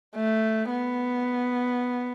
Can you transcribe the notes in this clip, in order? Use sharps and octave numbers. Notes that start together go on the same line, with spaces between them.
A3
B3